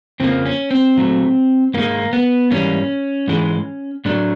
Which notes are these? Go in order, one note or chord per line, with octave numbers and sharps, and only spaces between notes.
F2 C#3 F3 A#3 C4
C#4
C4
A#2 F#3 A3
G#2 D#3 G#3 A#3
B3
G#2 E3 G3 A#3 C#4
G#2 E3 G#3
A2 F#3 A3 D4